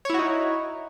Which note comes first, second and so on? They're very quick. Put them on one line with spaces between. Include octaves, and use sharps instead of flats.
C#5 E4 F#4 D#4